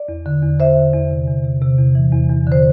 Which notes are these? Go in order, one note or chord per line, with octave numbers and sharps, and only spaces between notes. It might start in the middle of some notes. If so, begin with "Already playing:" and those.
Already playing: D5
E2
D3
E2
D3 C5 E5
D3
E2
C3
E2
C3
C3
E2
E3
E2
E2
D3 C5